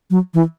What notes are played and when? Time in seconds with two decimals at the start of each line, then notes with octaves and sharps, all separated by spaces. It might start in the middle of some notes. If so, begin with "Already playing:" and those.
0.10 F#3
0.34 E3